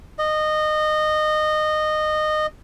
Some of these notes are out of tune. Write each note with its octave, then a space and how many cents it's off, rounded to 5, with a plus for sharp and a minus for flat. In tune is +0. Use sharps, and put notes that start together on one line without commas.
D#5 -20